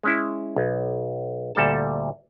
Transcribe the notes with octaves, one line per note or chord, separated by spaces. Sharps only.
G#3 C#4 E4
B1
D2 A#2 G3 A4 A5